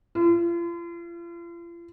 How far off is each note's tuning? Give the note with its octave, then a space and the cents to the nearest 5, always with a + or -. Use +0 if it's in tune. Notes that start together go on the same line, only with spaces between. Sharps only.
F4 -40